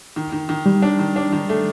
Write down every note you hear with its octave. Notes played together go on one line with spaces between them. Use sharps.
D#3
D#3
D#3
D#3 G3
D4
D#3
D4
D#3
A3